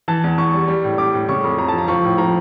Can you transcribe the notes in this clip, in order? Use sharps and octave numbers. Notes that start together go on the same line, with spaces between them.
E3 A5
E2
E2 C#6
G3
G3
A2
G3 D6
A2
C#3 C#6
F2
F2 A#5
A5
F3 A#5
F3 C#6
A2
F3 A#5